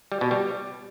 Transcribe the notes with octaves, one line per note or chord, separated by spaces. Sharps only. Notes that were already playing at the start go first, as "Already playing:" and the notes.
G3
B2
G3